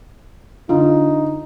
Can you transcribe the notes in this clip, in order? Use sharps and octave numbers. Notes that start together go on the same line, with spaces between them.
D3 D#4 F4